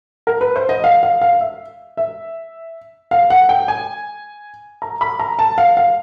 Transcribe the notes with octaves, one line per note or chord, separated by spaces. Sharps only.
A#4
B4
C5
D#5
F5
F5
F5
E5
E5
F5
F#5
G5
G#5
A#5
B5
A#5
A5
F5
F5